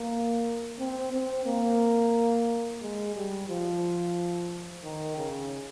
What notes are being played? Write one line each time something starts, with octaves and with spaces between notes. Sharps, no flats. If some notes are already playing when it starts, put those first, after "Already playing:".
Already playing: A#3
C4
C4
A#3
G#3
G3
F3
D#3
C#3